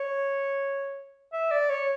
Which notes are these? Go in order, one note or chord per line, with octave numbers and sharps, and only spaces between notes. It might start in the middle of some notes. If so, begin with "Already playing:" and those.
Already playing: C#5
E5
D5
C#5